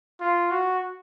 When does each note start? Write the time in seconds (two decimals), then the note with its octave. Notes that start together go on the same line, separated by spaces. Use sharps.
0.20 F4
0.51 F#4